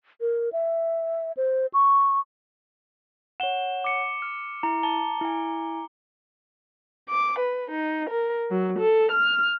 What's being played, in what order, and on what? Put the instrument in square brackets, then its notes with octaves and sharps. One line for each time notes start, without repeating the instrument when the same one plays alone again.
[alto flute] A#4
E5
C5
C#6
[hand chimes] C#5 F#5 [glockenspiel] E7 G7
[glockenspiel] D6 C#7
[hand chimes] F6
[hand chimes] E4 [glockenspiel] A#5
[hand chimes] A5 [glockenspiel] G7
[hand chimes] E4 G#5
[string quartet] D6
B4
D#4
A#4
F#3
A4
F6